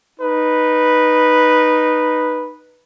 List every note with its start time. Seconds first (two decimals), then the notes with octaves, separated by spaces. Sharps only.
0.18 D#4 B4